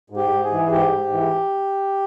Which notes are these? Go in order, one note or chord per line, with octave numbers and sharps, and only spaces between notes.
G#2
G4
G#2
G#4
E3
G#2 G4
G#2
E3